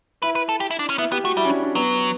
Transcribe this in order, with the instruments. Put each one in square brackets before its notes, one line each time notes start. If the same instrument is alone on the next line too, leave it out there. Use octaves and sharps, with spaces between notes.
[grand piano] E4 [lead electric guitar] B4
[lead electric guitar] B4
A4
G4
E4
D4
C#4
[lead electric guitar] B3 [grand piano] E4
[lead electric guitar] B3 [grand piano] G4
[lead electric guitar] A3 [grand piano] F#4
[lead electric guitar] G3 [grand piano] E4
[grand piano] C#4
D4
D4
[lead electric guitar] F#3 [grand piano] B3